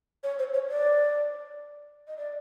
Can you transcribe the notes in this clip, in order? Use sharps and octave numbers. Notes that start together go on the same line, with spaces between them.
C#5
C5
C#5
D5
D#5
D5